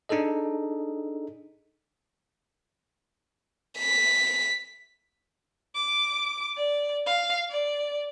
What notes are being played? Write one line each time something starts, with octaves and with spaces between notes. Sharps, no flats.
D4 D#4 G#4 A4 D#5
B6
D6
D5
F5
D5